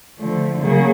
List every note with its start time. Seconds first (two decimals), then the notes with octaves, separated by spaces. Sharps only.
0.18 D3 F3 A3
0.61 C#3 F#3 A#3